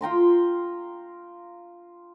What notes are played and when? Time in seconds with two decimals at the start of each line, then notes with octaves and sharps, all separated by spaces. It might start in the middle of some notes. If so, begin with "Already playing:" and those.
0.01 F4 G5 A#5 C6